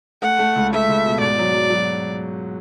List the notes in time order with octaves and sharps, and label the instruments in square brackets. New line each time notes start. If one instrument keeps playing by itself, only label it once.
[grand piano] A3 [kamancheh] F#5
[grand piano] A3
C#2
[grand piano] A3 [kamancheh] E5
[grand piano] C#2
B2
[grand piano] G#2 [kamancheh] D5
[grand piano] F#3
F#3
F#3